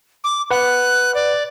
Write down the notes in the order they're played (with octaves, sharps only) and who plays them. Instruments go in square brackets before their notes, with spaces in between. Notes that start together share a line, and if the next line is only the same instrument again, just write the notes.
[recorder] D6
[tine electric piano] B4 F#5 [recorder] F#6
[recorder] D5